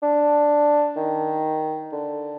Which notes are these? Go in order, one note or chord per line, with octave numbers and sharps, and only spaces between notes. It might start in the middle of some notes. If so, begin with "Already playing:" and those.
D4
D#3
D3